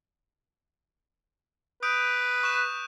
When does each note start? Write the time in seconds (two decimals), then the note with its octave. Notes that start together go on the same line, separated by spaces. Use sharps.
1.83 B4 D#6 G6 D7
2.43 C#6 F#6 E7